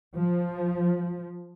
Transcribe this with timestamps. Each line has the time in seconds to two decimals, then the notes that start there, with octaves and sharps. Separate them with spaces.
0.16 F3